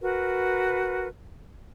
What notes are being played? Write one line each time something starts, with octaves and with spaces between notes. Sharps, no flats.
F#4 A#4 B4